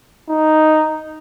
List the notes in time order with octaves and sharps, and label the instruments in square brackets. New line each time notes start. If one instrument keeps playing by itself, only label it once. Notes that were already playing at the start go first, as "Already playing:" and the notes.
[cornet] D#4